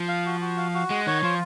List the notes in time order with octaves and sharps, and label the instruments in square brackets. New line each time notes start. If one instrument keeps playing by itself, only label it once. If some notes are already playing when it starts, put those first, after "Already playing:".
Already playing: [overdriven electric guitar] F3
[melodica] F5
F#4
F#4
F5
F#4
[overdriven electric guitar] G#3 [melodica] F#5
[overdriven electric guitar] D#3 [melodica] C#5
[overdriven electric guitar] F3 [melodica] F4